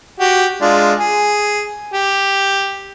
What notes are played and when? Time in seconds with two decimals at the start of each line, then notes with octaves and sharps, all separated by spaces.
0.20 F#4 G4
0.62 G#3 D4 F4
0.99 G#4
1.94 G4